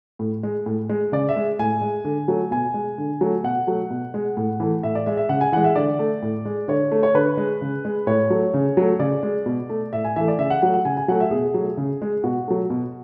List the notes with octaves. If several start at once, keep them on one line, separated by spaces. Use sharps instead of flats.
A2
G#3
A2
G#3
C#3 D5
E5
G#3
A2 G#5
G#3
D3
F#3 A3
B2 G#5
G#3
D3
F#3 A3
B2 F#5
F#3 A3
B2
G#3
A2
E3 A3
A2 E5
D5
G#3 E5
E5
C#3 F#5
G#5
E3 G#3 F#5
E5
D3 D5
A3
A2
G#3
D3 C#5
A3
C#5
D3 B4
G#3
C#3
G#3
A2 C#5
F#3 A3
C#3
F#3 A3
C#3 D5
G#3
B2
A3
A2 E5
G#5
E3 A3 E5
D5
C#3 E5
F#5
F#3 A3 F#5
F#5
C#3 G#5
G#5
F#3 A3 F#5
E5
B2 G#4
F#3 A3
C#3
G#3
B2 F#4
F#3 A3
B2